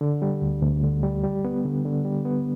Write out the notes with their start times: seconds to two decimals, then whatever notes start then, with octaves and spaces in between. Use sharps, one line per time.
0.01 D3
0.22 G3
0.42 D2
0.62 D2
0.83 D3
1.03 G3
1.24 G3
1.45 B3
1.65 D3
1.85 D3
2.05 G3
2.25 B3